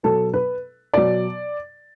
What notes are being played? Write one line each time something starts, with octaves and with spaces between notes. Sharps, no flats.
B2 F#3 A4
B4
B2 F#3 D5